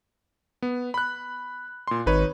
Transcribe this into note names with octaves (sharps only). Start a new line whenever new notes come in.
B3
B5 F#6
A#2 C6
G#1 D#4 B4 C#5